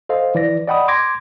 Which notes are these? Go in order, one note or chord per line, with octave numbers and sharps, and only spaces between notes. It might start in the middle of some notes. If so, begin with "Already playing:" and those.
A4 C5 D#5 F5
E3 D5 A#6
D5 D#5 F#5 G5 B5 D#6
C6 D6 G#6 A#6